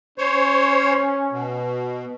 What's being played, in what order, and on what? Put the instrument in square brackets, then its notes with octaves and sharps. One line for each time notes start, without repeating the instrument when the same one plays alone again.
[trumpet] C#4 [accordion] C5 C#5
[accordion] B2